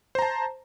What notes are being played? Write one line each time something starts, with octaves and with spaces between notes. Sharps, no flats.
C5 A5 A#5